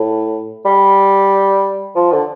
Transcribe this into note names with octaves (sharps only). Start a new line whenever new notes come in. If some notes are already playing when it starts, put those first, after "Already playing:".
Already playing: A2
G3
F3
D3